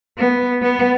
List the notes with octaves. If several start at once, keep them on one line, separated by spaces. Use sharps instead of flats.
B3
B3